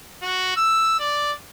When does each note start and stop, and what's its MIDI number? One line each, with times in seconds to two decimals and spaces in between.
0.23 0.56 66
0.57 0.98 88
1.00 1.32 74